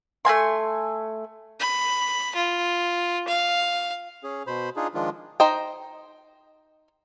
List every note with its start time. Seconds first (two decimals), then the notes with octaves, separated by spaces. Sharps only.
0.25 A3 A#3 G#5 C6
1.60 B5
2.35 F4
3.28 F5
4.23 C#4 G#4
4.47 B2 C5 B5
4.76 D4 D#4 F4 G#4
4.95 D#3 F3 G#3 D4 F4
5.40 D#4 C5 D#5 G5